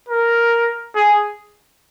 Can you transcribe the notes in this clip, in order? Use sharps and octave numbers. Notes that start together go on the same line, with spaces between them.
A#4
G#4